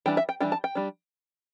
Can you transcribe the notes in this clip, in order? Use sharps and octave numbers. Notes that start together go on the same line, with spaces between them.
E3 G3 D4 G5
E5
G5
E3 G3 D4 G5
A5
G5
G3 D4